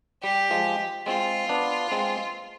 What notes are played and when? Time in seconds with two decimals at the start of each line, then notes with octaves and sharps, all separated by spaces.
0.23 G3 G4
0.51 F3 G#3
1.06 G#3 C4 F4
1.49 B3 D4
1.91 G#3 C4